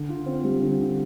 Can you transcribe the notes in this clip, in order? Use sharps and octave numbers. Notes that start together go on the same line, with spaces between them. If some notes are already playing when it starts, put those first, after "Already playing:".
Already playing: D3
F4
C4
G3
D3
F4